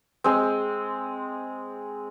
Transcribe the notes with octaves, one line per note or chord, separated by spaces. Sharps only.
G#3 C4